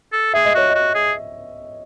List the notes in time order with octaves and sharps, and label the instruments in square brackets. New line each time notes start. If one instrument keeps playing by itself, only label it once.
[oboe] A4
[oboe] G#4 [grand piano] E5
[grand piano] D#5
[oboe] F#4 [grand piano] C#5
[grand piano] D#5
[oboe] F#4
G#4